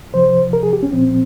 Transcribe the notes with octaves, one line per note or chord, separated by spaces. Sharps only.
C3 F3 C5
A#4
G#4
G4
C#4
A#2 F3 C4